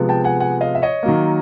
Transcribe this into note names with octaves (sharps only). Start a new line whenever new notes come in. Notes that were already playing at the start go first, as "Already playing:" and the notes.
Already playing: C3 F3 G#3 B3
G5 A5
F#5 G#5
F#5 G#5
D#5 F5
E5
C#5 D#5
D#3 F#3 A#3